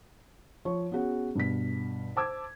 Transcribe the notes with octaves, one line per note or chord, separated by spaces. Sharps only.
F3 C#5 C#6
B3 C#4 F#4 G#4
G2 B2 B6
C5 A5 D6 E6 G#6